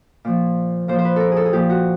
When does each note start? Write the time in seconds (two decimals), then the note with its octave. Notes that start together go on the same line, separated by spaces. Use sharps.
0.25 A#2 F3
0.88 A#2 F3 C5
0.99 C5
1.05 B4
1.16 A4 A#4
1.31 G#4
1.37 A4
1.46 G#4
1.53 A#2 F3 G4
1.70 F#4